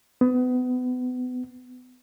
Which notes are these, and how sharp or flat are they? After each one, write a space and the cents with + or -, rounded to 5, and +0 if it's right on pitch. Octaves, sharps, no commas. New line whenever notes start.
B3 +30